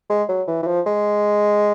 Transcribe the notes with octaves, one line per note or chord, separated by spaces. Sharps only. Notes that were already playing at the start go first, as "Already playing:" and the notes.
G#3
F#3
E3
E3
F3
G#3